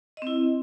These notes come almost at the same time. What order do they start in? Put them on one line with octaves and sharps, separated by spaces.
D#5 C4 E4